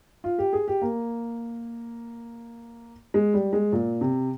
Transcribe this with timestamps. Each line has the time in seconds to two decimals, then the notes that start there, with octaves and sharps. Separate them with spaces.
0.24 F4
0.38 G4
0.53 G#4
0.68 G4
0.82 A#3
3.14 G#3
3.34 G3
3.53 G#3
3.72 A#2
4.01 C3